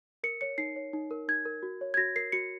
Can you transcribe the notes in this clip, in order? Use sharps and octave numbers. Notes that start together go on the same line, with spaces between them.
A#4 C#7
C#5 C#7
D#4 C7
C#5
D#4
A#4
D#4 G#6
A#4
F#4
C#5
G#6
F#4 A#6
A#4 C7
F#4 C#7